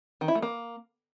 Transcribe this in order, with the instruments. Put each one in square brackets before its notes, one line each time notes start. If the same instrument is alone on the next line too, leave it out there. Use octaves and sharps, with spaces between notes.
[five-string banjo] D#3
E4
A3
A#3